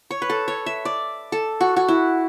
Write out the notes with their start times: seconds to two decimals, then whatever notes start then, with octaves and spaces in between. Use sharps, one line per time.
0.11 C#5
0.22 B4
0.30 A4
0.48 C#5
0.66 E5
0.85 D5
1.32 A4
1.61 F#4
1.76 F#4
1.88 E4